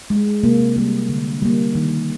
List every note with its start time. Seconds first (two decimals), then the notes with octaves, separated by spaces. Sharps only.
0.10 G#3
0.43 C3 A#3
0.76 G3 A#3
1.09 D3
1.42 G3 A#3
1.75 D#3